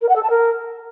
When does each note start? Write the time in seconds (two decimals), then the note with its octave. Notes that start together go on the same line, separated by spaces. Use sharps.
0.02 A#4
0.09 F#5
0.16 A4
0.23 A5
0.30 A#4